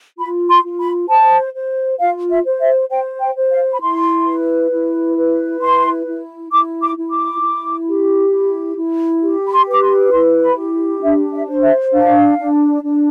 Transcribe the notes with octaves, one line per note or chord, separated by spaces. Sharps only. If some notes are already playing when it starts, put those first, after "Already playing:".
F4 B5
C6
F4
B5
C5 A5
C5
F4 F5
E5
C5
E5
C5 G5
G5
C5
F5
B5
E4 C6
B4
E4
B4
E4 C6
E4
E4 D6
D6
E4
D6
E4
G4
E4
E4
G4
B5
C6
B4 D6
C6
E4 C6
B5
G4
D4 E5
E5
C5
E5
D4 F5
D4
D4